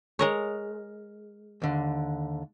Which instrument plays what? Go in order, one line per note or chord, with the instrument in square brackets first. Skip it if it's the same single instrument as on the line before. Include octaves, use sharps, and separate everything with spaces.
[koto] G#3 A#4 C#5
[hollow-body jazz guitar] D#2 D3